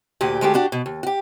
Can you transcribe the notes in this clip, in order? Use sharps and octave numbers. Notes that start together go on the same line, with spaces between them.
D2 A#2 G4
D2 G#3 A3 G4
D4 F#4 G4
B2
D#2
F#4 G4